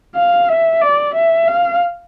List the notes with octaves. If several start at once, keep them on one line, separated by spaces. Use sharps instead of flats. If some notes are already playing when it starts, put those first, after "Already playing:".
F5
E5
D5
E5
F5